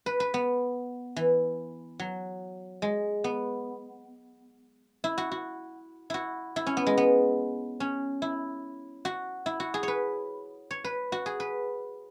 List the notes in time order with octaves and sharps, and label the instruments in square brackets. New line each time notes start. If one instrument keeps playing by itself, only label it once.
[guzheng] B4
B4
B3
E3
F#3
G#3
B3
E4
F#4
F#4
E4 F#4
E4
C#4
B3
G#3
B3
C#4
E4
F#4
E4
F#4
G#4
C#5
B4
C#5
B4
F#4
G#4
B4